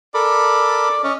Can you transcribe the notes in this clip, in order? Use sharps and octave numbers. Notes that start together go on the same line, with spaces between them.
A4 A#4 D5 B5
C#4 D#5